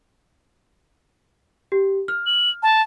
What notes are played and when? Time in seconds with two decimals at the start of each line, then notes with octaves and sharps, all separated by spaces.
1.72 G4
2.08 F6
2.26 F#7
2.63 A5